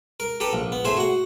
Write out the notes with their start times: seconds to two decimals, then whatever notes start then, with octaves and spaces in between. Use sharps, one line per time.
0.20 A#4
0.40 G4 A4 B4 A#5
0.53 A#1
0.72 B3
0.85 A2 G#4 C5 E5
0.97 F#4 F#5